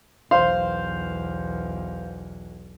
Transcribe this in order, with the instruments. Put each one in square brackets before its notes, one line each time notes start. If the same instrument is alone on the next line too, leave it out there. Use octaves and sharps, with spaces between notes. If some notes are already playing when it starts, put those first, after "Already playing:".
[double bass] B1 E2 [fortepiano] C5 F5 C6